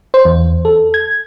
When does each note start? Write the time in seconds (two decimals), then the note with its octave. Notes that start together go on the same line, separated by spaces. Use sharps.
0.14 C5
0.25 E2
0.65 A4
0.94 G#6